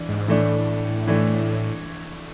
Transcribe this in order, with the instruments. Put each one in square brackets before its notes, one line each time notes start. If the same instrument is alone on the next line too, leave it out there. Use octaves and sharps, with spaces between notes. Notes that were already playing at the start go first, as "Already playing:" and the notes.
Already playing: [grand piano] E3 D4
[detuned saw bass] G#2
[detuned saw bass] A2 [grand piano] E3 A3 D4
[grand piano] E3 A3 D4